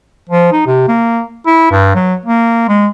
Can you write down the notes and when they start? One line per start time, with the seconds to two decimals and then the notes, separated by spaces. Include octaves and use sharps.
0.29 F3
0.52 D#4
0.67 C3
0.88 A#3
1.46 E4
1.71 G2
1.95 F#3
2.26 A#3
2.68 G#3